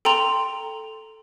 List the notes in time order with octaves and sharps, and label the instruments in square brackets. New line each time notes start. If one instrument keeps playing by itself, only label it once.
[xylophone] A4 G5 A#5 C6 F7